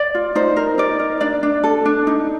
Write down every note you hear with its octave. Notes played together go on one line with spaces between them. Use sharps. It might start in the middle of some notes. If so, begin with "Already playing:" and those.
Already playing: D5
F4
D#4 C5
A#4
D#4 D5
A#4
D4 D5
D4
A4
D4
D#4